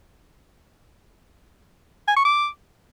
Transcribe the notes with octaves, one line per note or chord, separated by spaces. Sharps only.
G#5
C#6
D6